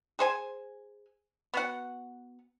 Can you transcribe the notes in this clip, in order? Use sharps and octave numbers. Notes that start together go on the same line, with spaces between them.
G#4 C5 G#5
B3 F#4 F#5